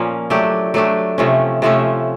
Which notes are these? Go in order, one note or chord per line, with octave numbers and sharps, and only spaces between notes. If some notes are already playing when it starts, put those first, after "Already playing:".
Already playing: A#2 F3 A#3 C#4
F#3 A3 D4 G4
F#3 A3 D4 G4
C3 F3 A3 C#4
C3 F3 A3 C#4